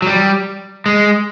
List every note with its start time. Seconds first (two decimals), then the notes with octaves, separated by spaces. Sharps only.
0.02 F#3
0.07 G3
0.86 G#3